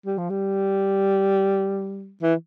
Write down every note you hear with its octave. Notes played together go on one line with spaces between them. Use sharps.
G3
F3
G3
E3